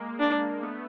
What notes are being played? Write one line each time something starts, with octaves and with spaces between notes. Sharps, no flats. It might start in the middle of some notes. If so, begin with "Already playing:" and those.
Already playing: G#3 A#3
D4
A3 B3